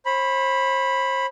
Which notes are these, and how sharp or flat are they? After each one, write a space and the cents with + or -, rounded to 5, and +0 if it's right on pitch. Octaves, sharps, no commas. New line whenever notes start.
C5 +40 B5 +0